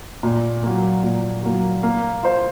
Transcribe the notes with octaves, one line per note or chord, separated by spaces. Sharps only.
A#2
F#3 A#3
A#2
F#3 A#3
A#3
F4 C5